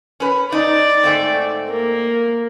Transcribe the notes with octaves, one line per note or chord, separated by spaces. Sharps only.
C#4 B4
D#4 D5
G#2 A3 C4
A#3